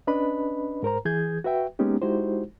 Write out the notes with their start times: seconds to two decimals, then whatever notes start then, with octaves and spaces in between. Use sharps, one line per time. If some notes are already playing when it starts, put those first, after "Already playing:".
0.07 C#4 D4 B4 D#5 B5
0.83 G#2 A#4 C5 A#5
1.05 E3 G#4 G6 G#6
1.44 F#4 B4 E5 G5
1.79 G#3 A#3 B3 C#4 D#4 G4
2.01 G#3 D#4 E4 F#4 G4 C5